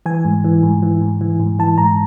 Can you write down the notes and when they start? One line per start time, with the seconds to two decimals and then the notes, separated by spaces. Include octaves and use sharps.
0.06 E3 G#5
0.25 G#2
0.44 E3
0.63 G#2
0.83 E3
1.01 G#2
1.21 E3
1.40 G#2
1.59 E3 A5
1.78 G#2 A#5